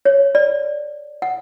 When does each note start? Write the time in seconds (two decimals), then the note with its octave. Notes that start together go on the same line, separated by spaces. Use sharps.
0.05 C#5
0.35 D5
1.22 F#5